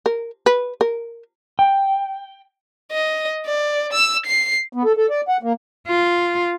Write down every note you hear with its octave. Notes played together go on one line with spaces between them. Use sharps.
A#4
B4
A#4
G5
D#5
D5
E6
C7
B3
A4
A4
D5
F#5
A#3
F4